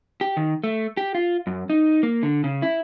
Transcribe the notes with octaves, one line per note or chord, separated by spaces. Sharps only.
G4
D#3
A3
G4
F4
F#2
D#4
A#3
D3
C#3
E4